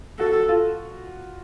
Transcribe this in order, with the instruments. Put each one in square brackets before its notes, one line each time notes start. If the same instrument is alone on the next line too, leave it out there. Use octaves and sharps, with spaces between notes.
[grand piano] F#4 [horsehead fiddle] A4
[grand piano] F4